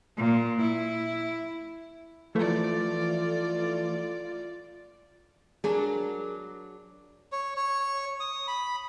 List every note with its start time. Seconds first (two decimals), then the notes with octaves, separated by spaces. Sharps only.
0.17 A#2
0.60 E4
2.35 E3 F3 A3 F4 D5
5.64 F#3 D4 G#4 A#4
7.32 C#5
7.56 C#5
8.20 D#6
8.47 B5